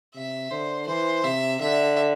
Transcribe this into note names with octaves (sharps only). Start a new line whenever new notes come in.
C3 E5
D3 C5
E3 C5
C3 E5
D3 E5